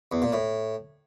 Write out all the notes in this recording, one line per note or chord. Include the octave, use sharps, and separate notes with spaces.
E2
A#2
A2